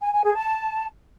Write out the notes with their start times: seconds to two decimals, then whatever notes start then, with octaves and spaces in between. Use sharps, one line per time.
0.02 G#5
0.13 G#5
0.24 G#4
0.35 A5